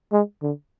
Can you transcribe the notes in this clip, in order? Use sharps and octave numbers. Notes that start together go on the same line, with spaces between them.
G#3
D3